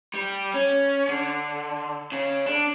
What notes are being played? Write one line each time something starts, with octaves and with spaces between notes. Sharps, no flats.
G3
C#4
D3
C#3
D4